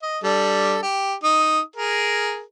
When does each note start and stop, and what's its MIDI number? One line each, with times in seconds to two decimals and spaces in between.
0.02 0.18 75
0.23 0.80 55
0.23 0.80 62
0.23 0.80 69
0.83 1.14 67
1.24 1.60 63
1.24 1.60 87
1.76 2.42 68
1.76 2.42 70